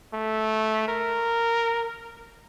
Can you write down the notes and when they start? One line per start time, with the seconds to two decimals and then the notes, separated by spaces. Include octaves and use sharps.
0.14 A3
0.88 A#4